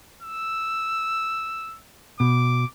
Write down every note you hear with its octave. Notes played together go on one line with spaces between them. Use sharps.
E6
B2 D6